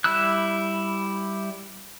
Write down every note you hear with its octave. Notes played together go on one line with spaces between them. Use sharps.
G3 E4 E6 F#6